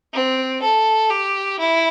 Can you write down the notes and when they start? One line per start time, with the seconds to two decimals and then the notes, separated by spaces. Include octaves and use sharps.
0.13 C4
0.62 A4
1.10 G4
1.59 E4